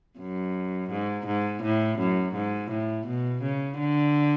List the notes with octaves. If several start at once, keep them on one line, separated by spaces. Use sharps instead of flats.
F#2
G#2
G#2
A2
F#2
G#2
A2
B2
C#3
D3